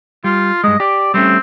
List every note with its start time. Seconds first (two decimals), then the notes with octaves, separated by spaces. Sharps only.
0.24 G3 F4
0.64 G2 G#3 D#5
0.80 G4 D5
1.14 G3 A3 C4 C#4